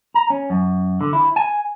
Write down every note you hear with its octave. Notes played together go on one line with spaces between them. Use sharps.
A#5
C#4
F#2
D3
E4
G#5